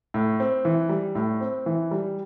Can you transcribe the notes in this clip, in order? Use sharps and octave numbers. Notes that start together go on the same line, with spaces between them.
A2
C4
E3
G3
A2
C4
E3
G3